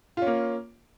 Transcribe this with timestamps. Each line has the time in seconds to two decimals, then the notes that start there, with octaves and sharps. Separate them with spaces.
0.17 F4
0.22 C#4
0.27 A#3